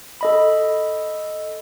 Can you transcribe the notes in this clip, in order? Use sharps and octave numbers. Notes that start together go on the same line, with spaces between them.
A4 D#5 B5